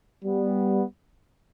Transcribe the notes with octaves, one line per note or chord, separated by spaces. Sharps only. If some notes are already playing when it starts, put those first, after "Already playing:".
G3 B3